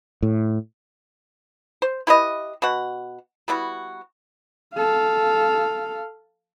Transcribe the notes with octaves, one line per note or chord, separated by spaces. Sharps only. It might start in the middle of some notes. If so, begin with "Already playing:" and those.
A2
C5
E4 G4 B4 D#5
B2 F#4 F#5
G3 B3 E4 F#4
A4 F5